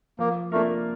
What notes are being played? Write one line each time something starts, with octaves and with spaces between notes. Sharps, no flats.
F3 A#3
A3 A#3 D4 F4 A#4